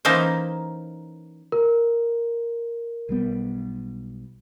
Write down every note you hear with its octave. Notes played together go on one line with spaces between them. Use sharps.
E3 A#3 C#4 D#4 A#4 C5
A#4
B1 G3 B3